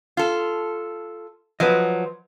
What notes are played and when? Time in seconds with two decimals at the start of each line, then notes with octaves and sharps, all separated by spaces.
0.17 F4 A4
1.60 F3 F#3 B4 D#5